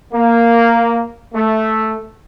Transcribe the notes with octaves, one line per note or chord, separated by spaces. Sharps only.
A#3
A3